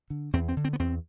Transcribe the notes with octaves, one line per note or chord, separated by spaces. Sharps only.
D3
E2 C4
C4
D3
C4
B3
E2 C4